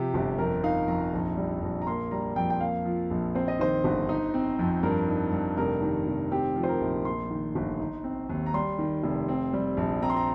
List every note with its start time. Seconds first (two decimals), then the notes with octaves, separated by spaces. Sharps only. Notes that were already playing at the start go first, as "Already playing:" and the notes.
Already playing: C3 F3 G4
0.14 G1
0.38 F2 A#4
0.63 D#4 F5
0.88 F2 A#5
1.13 A#1
1.37 G3
1.62 A#1
1.82 A#5
1.87 A#3 C6
2.11 G3 A#5
2.36 F2 G5
2.50 G5
2.60 A#3 F5
2.85 F3
3.11 A#1
3.35 C4 C5
3.48 D#5
3.59 D#3 C5
3.84 G1
4.09 D#4
4.34 C4
4.59 F2
4.83 G2 A#4
5.08 D#4
5.33 G2
5.57 F1 A#4
5.82 D#3
6.07 F1
6.31 C4 G4
6.56 F3
6.63 C5
6.69 A#4
6.81 A#1
7.05 A#3 C6
7.30 D#3
7.55 G1
7.80 D#4
8.04 C4
8.29 D#2
8.46 A#5
8.54 G3 C6
8.79 D#3
9.03 F1
9.29 C4
9.53 G3
9.77 A#1
10.02 C4 A#5
10.10 C6
10.17 A#5